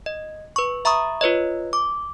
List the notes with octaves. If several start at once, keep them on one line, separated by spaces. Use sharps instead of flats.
D#5
B4 C#6
E5 A#5 B5 C#6 D#6
F4 B4 C#5 D#5
D6